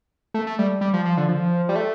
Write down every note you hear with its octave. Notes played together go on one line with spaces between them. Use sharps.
A3
A3
G3
G3
F3
F3
D3
F3
G3
A3